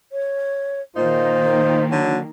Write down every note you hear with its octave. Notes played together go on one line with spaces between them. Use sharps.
C#5
A#2 D#3 A#3 D#4 F4 C5
D3 F#3